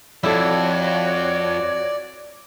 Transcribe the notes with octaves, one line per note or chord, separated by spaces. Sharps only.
F2 E4 F#4 A4 C#5 D5